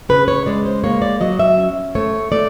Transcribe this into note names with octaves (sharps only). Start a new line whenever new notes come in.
C#3 B4
C#5
G#3 D5
C5
A#3 C#5
D5
F#3 D#5
E5
C#4
A3 C#5
A3 D5